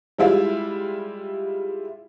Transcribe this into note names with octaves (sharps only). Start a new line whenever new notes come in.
G3 G#3 E4 F4 E5